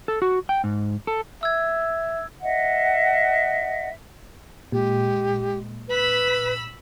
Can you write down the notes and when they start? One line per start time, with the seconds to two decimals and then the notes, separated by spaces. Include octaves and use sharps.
0.08 A4
0.22 F#4
0.49 G5
0.64 G#2
1.07 A4
1.43 E5 E6 G#6
2.42 D#5 E5 F#5
4.72 A#2 G#3 G4
5.88 B4 B5 E6